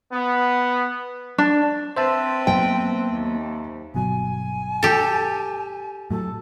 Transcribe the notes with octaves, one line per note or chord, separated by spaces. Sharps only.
B3
D4
C4 B4 C5 E5 A5
F#3 A#3 B3 G5
D#2
G1 B2 F#3 G#5
G4 A4
A2 F#3 A4